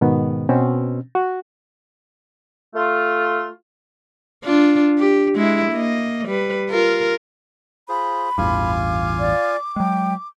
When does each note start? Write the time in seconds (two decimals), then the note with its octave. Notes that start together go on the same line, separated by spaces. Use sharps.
0.01 G#2 B2 D#3 B3
0.49 B2 C4 C#4
1.15 F#4
2.75 A3 F4
4.44 D4 F4
4.99 G4
5.36 G#3 E4
5.72 A#3 D#5
6.27 G3 B4
6.70 F4 A#4
7.89 F4 G#4 C5 B5
8.38 A1 E2 G2 F4 F5 G#5 D6
9.19 D5
9.76 F#3 G#3 G5